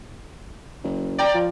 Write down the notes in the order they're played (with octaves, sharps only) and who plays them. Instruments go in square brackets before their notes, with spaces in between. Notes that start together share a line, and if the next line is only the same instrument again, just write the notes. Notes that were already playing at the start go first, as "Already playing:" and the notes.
[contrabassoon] F#1
[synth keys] D5 G5 A#5
[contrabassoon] F3